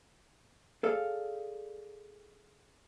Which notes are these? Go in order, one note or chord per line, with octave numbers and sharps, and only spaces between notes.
G#4 A4 D5 F5